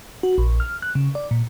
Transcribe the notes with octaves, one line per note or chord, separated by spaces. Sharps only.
F#4
A#1
F6
F#6
C#3
D5
A#2